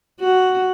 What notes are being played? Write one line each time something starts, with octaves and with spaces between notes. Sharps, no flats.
F#4